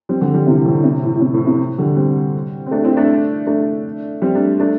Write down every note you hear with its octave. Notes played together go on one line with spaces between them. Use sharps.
G3 C4
D3 G3
D3 G3
C3 E3
E3
A2 D3
C3
A2
A2
C3
A2
C3
D3 G3
G3 C4
C4
A3 D4
C4 E4
A3 D4
A3 D4
G3 C4
A3 D4
A3 D4